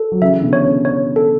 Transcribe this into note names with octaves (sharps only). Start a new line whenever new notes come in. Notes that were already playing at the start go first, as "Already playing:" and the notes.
Already playing: A4
F#3
C#3 E3 E5
B2 D3
C#5
C#3
C#5
A4